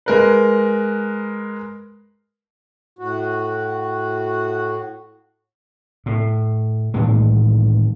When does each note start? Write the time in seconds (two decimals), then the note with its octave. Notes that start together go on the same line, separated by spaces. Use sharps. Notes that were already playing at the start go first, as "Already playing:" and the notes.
0.06 G#3 A#4 B4
2.99 A2 F#4
6.06 A2
6.94 A2 D#3 E3 G#3